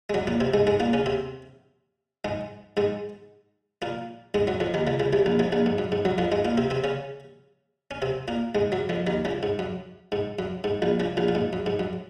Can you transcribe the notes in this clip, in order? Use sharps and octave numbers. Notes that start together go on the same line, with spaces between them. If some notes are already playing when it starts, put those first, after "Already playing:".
G#3
F#2 F#3
A#2 A#3
C3 C4
G#2 G#3
G#2 G#3
A#2 A#3
C#3 C#4
C3 C4
G#2 G#3
G#2 G#3
A#2 A#3
G#2 G#3
F#2 F#3
F2 F3
D#2 D#3
C#2 C#3
C#2 C#3
C2 C3
A#1 A#2
C2 C3
A#1 A#2
G#2
F#2
G#2
F#2 F#3
F2 F3
G#2 G#3
A#2 A#3
C3 C4
C3 C4
C#3 C#4
C#4
C3 C4
A#2 A#3
G#2 G#3
F#2 F#3
F2 F3
D#2 D#3
C#2 C#3
G#2
F#2
G#2
F#2
G#2
A#1 A#2
C#2 C#3
A#1 A#2
A#2
G#2
F#2
G#2
F#2